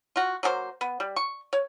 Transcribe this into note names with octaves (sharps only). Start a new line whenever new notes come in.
F4 F#4
F#3 A#3 G#4 C5
B3
G3
C#6
C#5